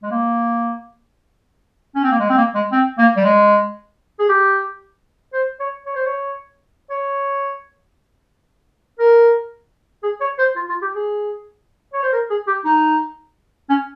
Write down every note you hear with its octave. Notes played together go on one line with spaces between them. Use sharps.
G#3
A#3
C#4
C4
A#3
G#3
C4
A#3
G#3
C4
A#3
G3
G#3
G#4
G4
C5
C#5
C#5
C5
C#5
C#5
A#4
G#4
C#5
C5
F4
F4
G4
G#4
C#5
C5
A#4
G#4
G4
D#4
C#4